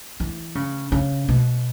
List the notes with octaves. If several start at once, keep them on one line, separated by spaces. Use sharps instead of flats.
E3
C#3
C#3
B2